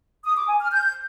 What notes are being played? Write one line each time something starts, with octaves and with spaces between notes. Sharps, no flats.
D#6
D6
G#5
F6
G6